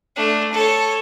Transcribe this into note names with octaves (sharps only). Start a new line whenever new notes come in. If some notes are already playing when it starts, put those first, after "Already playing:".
A3 D4
A4 C#5